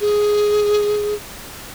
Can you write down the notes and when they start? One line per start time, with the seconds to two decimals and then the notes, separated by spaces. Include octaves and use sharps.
0.01 G#4